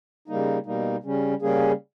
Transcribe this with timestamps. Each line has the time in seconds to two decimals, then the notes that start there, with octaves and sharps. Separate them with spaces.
0.28 C#3 G3 A#3 D#4
0.66 B2 G3 A#3 D#4
1.03 C#3 G3 C#4
1.42 C#3 G3 A#3 C#4 G#4